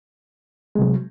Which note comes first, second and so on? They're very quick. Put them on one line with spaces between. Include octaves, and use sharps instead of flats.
G#3 C3 F#3